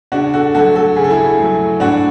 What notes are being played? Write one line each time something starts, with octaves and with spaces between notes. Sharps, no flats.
C#3 D4 F#4
F#4 A4
F#3 A3 F#4 A4
F#4 A4
C#3 G#4
A4
E4 G#4
F#3 A3
A2 D4 F#4